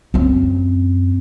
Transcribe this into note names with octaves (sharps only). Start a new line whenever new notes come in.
F#2 C4